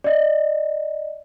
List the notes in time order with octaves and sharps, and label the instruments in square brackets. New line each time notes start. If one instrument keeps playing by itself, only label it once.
[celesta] D5 D#5